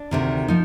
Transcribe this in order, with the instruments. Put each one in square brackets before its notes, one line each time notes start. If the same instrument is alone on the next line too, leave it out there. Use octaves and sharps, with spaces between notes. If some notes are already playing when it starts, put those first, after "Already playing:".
Already playing: [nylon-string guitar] D4
D2 C3 D#3
F3 D#4